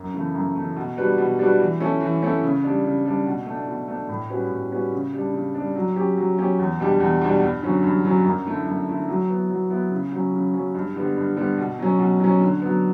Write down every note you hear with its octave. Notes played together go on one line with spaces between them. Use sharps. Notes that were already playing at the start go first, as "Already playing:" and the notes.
Already playing: F#2
C#3 E3 A3
F#2
C#3 E3 A3
B2
G3 D4 F#4 B4
B2
G3 D4 F#4 B4
E3
A3 C#4 E4 A4
E3
A3 C#4 E4 A4
C#3
G3 D4
C#3
G3 D4
B2
A3 D4
B2
A3 D4
A2
G3 C#4 F#4 B4
A2
G3 C#4 F#4 B4
C#3
G3 D4
C#3
G3 D4
F#3
C#4 G4
F#3
C#4 G4
E2
B2 G3 D4 G4
E2
B2 G3 D4 G4
G2
D3 F#3 C#4
G2
D3 F#3 C#4
F#2
D3 A3 E4
F#2
D3 A3 E4
F#3
B3 E4
F#3
B3 E4
C#3
F#3 C#4
C#3
F#3 C#4
G2
D3 G3 B3
G2
D3 G3 B3
B2
F#3 C#4
B2
F#3 C#4
D3
F#3 B3